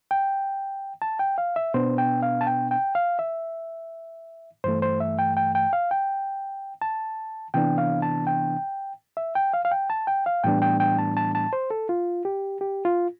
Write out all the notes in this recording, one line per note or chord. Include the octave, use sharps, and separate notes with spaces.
G5
A5
G5
F5
E5
B2 B3 D4 C5
G5
F5
A5
G5
G5
F5
E5
G2 E3 A3 C5
C5
E5
G5
G5
G5
F5
G5
A5
C3 E3 B3 D4 G5
F5
A5
G5
E5
G5
F5
F5
G5
A5
G5
F5
A2 E3 G3 B3 D4 G5
G5
G5
A5
A5
A5
C5
A4
F4
G4
G4
F4